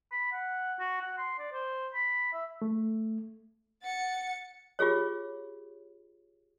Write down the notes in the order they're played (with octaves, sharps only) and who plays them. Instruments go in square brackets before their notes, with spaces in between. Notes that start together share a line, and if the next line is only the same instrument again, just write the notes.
[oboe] B5
F#5
F#4
F#5
C6
D5
C5
B5
E5
[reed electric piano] A3
[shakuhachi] F#5 [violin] A6 C#7
[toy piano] F4 G4 G#4 C#5